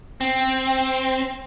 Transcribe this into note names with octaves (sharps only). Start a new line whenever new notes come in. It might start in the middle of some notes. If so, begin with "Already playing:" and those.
C4